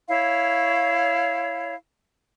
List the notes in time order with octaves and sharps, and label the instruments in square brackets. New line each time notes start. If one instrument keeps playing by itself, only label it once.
[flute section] E4 C#5 F5